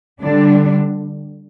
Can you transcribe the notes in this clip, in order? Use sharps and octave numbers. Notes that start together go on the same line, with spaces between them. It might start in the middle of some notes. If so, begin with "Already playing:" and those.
D3 G3 D4